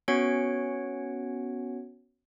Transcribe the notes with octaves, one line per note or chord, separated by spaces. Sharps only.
B3 C#4 F#4 C#5 F#5 D7